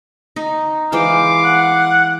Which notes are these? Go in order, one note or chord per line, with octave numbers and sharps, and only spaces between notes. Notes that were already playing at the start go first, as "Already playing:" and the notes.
D#4
E3 G#3 C5 F5 D6
F#5